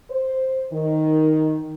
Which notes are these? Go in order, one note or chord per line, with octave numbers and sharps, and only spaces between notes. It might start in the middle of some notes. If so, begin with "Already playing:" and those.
C5
D#3